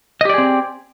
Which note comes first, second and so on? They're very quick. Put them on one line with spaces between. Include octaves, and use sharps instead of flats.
D#5 G4 D5 G#4 C4